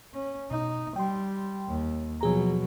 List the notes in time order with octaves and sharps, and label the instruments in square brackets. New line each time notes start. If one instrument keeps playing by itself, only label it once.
[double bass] C#4
[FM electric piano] B2 [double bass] D#4
[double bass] G3 [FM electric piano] G5 C6
[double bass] D#2
[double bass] B2 F#3 [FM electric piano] F3 G#4 A#5